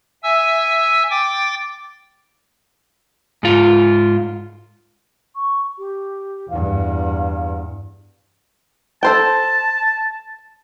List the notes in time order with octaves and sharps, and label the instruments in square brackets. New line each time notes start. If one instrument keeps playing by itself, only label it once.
[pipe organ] E5 G#5 E6
G5 D6 A6
[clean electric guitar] G#2 F4
[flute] C#6
G4
[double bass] E2 G2 [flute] F5
[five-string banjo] A4 C5 G5 [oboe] A5